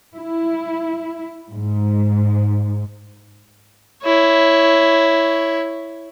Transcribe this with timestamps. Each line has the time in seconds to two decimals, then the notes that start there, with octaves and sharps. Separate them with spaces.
0.16 E4
1.50 G#2
4.03 E4 C#5